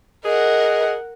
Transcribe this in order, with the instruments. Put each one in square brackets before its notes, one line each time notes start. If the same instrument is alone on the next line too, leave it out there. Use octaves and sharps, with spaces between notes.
[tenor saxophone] G#4 [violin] A#4 F#5 [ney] D#5